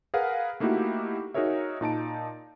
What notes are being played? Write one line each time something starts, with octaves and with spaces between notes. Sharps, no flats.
G#4 A#4 B4 F5 F#5
A3 A#3 D#4 E4 F#4 G4
D#4 F#4 G#4 A#4 C#5 E5
A#2 D#4 A5 D7